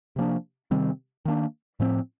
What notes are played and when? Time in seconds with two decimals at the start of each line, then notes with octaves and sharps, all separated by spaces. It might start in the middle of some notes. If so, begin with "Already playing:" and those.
0.16 C3 F3 A#3 D4
0.71 C3 D#3 G3 C4
1.25 D#3 A#3 D4
1.80 A2 F3 C4